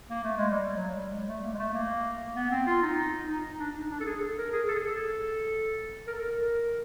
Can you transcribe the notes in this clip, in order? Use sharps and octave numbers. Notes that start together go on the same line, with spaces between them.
A#3
A3
G#3
G3
F#3
G3
G#3
A3
A#3
G#3
A3
A#3
B3
C4
F4
D#4
D#4
D4
D#4
D4
A4
G#4
A4
A#4
G#4
A4
G#4
A4
A#4
A4
A#4